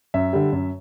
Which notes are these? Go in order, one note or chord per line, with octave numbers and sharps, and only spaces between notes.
F#2 E5
D3 G3
F#2